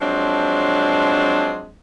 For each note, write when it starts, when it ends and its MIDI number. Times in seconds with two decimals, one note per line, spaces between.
0.01 1.71 53
0.01 1.71 54
0.01 1.71 56
0.01 1.71 60
0.01 1.71 62